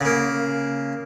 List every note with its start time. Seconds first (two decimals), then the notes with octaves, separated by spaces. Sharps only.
0.01 C#3 A#3